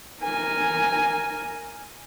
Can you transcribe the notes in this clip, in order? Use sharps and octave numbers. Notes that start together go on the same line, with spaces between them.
A#4 G#5